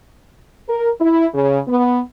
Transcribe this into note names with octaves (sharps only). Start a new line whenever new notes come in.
A#4
E4
C#3
B3